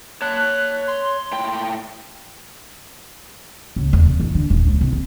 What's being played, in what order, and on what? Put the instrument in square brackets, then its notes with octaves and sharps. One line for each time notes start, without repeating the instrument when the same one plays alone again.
[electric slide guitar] C#5 A5 [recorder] F#6
[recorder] C6
[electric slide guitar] A2 G5
[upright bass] C#2
E2
C3
E3
D3
D#1
C#2
C2
C4